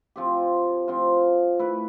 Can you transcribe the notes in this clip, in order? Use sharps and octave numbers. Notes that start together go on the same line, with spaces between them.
F3 C4 G4
F3 C4 F4
A3 E4 B4